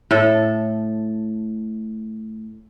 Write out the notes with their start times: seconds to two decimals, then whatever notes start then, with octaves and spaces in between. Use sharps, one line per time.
0.11 A2 A4